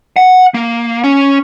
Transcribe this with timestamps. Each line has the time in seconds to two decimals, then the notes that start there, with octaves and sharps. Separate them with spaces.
0.16 F#5
0.54 A#3
1.04 C#4